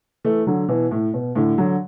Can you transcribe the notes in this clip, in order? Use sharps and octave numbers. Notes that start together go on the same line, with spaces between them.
E3 A3
D3 F#3
B2 E3
A2
B2
A2 D3
D3 F#3